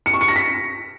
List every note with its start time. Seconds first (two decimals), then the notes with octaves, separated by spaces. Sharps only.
0.06 C#7
0.13 C#6
0.21 C#7
0.28 A#6
0.36 B6